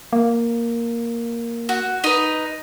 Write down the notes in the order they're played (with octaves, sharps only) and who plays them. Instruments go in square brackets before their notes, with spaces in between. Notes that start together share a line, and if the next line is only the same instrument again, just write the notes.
[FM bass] A#3
[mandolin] F#4
D#4 B4